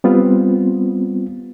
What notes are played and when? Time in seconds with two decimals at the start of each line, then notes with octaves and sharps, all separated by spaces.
0.04 G3 B3 C4 F4